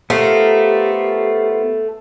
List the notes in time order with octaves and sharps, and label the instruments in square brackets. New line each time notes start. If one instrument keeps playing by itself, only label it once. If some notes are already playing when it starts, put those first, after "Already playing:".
[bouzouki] A3 [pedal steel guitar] B3 F4 A#4 [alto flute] G4 [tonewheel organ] A4 C5